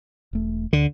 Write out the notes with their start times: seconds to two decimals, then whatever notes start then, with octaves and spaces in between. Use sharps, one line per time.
0.33 E1 A3
0.73 D2 D3